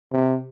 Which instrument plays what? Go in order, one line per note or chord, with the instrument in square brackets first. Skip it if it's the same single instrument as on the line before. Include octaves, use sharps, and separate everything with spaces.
[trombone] C3